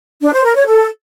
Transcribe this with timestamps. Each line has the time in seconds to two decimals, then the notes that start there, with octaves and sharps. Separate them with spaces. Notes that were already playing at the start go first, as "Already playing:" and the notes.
0.21 D4
0.32 C5
0.44 A#4
0.55 C#5
0.66 A4